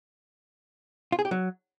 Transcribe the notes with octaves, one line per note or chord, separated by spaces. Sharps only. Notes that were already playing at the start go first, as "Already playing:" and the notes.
F4
G#4
G4
F#3